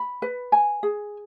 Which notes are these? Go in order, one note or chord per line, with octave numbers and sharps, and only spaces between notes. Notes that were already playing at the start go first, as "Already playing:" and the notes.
Already playing: B5
B4
G#5
G#4